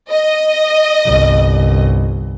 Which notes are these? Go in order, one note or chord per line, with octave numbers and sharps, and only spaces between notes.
D#5
G1 C2